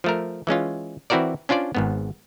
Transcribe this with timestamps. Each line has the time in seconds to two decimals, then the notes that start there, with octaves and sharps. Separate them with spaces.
0.04 F3 A3 A#4
0.47 E3 G#3 C#4 F4
1.10 E3 C4 E4 F#4 A#4 D5
1.49 C#4 D4 F4 C5 D5
1.75 G#1 G#2 B3